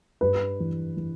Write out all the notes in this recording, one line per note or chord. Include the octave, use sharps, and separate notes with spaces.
G2 B4
E3
E3